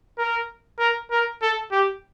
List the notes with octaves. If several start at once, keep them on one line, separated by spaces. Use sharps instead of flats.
A#4
A#4
A#4
A4
G4